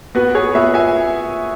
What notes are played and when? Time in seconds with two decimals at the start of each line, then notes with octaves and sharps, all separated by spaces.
0.15 B3 F#4 B4
0.35 G#4 C#5
0.54 B3 B4 E5
0.74 E5 G#5